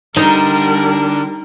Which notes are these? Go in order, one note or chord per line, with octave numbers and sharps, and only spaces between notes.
D3 G3 D#4 A#4